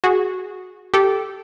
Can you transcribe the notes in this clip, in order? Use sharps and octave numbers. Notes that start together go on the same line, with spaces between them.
F#4 G#4
G4 A4